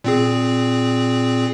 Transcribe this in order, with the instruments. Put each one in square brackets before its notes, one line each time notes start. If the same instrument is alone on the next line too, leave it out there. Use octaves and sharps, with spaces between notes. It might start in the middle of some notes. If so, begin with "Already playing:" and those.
[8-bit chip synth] A#2 C4 G#4